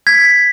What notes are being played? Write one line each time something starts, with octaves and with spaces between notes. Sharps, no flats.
G#6 B6